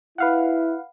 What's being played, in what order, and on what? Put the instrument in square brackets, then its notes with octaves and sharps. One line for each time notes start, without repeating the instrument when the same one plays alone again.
[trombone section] E4 [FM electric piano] B4 F5 F#5